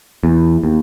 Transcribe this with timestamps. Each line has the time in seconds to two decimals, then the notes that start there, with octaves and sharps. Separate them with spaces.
0.24 E2
0.63 D#2